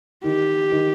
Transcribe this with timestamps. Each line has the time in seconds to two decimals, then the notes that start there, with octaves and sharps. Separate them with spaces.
0.24 D#3 G4
0.72 D#3